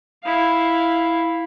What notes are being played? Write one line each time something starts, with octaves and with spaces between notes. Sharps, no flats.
E4 F5